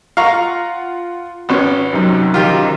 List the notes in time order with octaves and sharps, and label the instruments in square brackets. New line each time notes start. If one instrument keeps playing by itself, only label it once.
[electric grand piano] F4 F#5 [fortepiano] F5 A#5 C#6
[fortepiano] G#1 C#4 [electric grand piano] B3
[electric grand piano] F#2 C3 D#4 [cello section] F#3
[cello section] D#3 [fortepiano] F4 G4